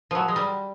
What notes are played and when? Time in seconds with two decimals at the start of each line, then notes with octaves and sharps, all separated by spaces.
0.11 F3 F#3
0.28 G#3
0.36 G3